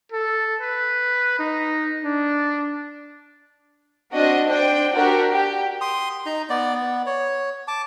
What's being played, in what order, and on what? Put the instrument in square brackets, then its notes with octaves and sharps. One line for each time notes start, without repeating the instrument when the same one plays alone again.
[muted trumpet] A4
B4
D#4
D4
[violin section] C4 D4 F#4 D#5
D4 C5 G5
D4 F#4 G4 A#4
G4
[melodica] C6 D#6
D#4 A#5
B3 D5
B3
C#5
A5 D6